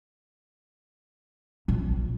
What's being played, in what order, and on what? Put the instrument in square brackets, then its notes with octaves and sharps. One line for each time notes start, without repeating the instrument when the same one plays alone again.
[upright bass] A#1